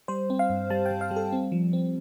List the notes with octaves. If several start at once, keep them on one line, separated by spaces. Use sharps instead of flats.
G3 C5
C4
F5
G2
G3 A5
G5
G3
F5
G3
A4
C4
F3
C4